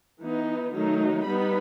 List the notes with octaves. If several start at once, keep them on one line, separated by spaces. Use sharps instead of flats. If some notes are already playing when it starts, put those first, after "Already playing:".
E3 B3 D#4
D#3 F#3 A3 D#4
G3 B3 D#4 B5